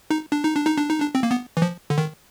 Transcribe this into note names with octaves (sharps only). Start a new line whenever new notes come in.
D#4
D4
D#4
D4
D#4
D4
D#4
D4
C4
A#3
B3
E3
F3
D3
D#3